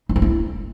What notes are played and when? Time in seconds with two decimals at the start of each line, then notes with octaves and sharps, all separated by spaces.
0.09 D#4
0.16 D4
0.22 E4